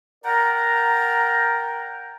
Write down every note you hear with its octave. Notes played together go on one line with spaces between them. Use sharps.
A#4 D5 F#5 G5 A#5